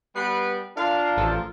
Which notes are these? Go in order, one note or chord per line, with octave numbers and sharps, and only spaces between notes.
G3 B3 B4 C7 D7
D4 F4 A#4 F5
A1 F3 A4